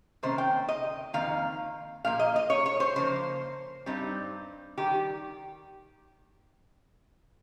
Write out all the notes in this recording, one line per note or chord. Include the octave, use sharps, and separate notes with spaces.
C3 D#3 A#3 C#4 C5
G5
D#5
F2 D#3 A#3 F5
A#2 F3 A#3 F5
D#5
D#5
C#5
C#5
C5
C#3 F3 A#3 C5
G2 G3 C4 D#4
D#3 G3 G4